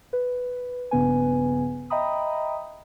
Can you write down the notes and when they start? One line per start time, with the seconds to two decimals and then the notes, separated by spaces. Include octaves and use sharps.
0.13 B4
0.91 A#1 G2 C#3 B3 B4 G#5
1.90 D#5 E5 G5 A#5 B5 D#6